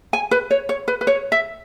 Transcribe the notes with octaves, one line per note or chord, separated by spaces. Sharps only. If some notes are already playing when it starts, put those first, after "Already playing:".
G#5
B4
C#5
C#5
B4
B4
C#5
E5